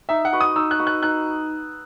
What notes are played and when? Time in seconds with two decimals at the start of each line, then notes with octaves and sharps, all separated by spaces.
0.09 D#4 E5
0.25 F#5
0.33 F#4 B4 D#5
0.41 D#6
0.56 D#4 E6
0.71 F#6
0.79 F#4 B4 D#5
0.87 F#6
1.03 D#4 F#6